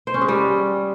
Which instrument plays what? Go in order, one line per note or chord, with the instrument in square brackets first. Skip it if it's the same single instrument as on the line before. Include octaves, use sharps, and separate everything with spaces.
[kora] C5
C#4
G#3
G3